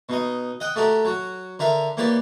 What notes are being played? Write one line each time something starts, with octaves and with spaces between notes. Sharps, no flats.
B2 D#4 D#5
D#5 F#5 G5
A3 F#4 G4 A#4
F#3 F#4
D3 A#4 E5 F5
E3 A#3 G4 C#5 D5